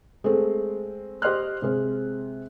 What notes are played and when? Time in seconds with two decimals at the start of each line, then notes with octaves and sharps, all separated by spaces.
0.24 G#3 A3 C4 A4
1.22 G4 C5 D#5 C6 F6 F#6
1.62 C3 G#3 C5